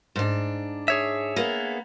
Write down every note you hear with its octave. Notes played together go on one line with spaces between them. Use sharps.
G#2 D4
G#4 C#5 E5
A#3 B3